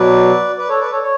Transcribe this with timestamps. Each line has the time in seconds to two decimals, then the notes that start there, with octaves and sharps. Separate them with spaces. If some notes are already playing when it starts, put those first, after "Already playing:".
Already playing: B2 F#3 B4 D5
0.58 B4 D5
0.69 A4 C#5
0.80 B4 D5
0.91 A4 C#5
1.02 C#5